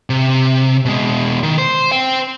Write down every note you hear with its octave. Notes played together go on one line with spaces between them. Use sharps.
C3
B2 G#3
D#3
C5
C5 G5